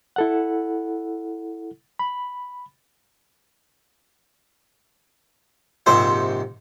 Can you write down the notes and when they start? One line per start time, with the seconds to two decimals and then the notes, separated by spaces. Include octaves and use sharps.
0.16 E4 A4 F#5
1.99 B5
5.86 A#1 G#2 C3 C5 E5